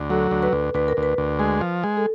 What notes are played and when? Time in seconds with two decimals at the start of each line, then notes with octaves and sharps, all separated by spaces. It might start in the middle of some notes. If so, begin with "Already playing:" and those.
Already playing: D2
0.10 F#3 A4
0.31 D2
0.43 B4
0.53 D2
0.74 D2 B4
0.88 A#4
0.97 D2
1.03 B4
1.18 D2
1.39 G#3
1.61 F3
1.84 G#3
1.97 A4